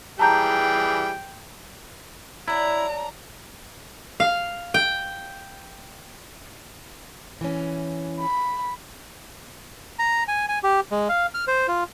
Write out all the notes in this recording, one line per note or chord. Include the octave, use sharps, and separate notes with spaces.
E3 G3 G#4 G5 A5 A#5 G6
F#3 D4 E4 A#5
F5
G5
E3 C#4
B5
A#5
G#5
G#5
G4
G#3
F5
F6
C5
F4